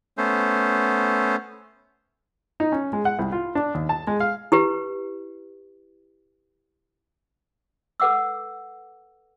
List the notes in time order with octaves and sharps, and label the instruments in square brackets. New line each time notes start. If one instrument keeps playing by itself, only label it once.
[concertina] A3 B3 C#4 C5
[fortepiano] D#4
C#4
G#3
F#5
C2
F4
D4
D#2
A5
G#3
F5
[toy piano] E4 G4 B4
A4 B4 F#5 D6 E6